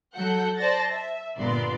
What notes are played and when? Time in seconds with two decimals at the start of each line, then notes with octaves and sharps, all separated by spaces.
0.15 F#3 A4 F#5 G6
0.57 C5 D5 A5 A6 A#6
0.91 E5
1.39 G1 A#2 B3 D5 C6